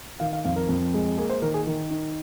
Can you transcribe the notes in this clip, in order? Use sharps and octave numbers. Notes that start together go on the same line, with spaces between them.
D#3 F5
F5
F2 F5
A#4
F2
G#3
A#3 G#4
C5
D#3 A#4
G#4
D#3 A#4
D#4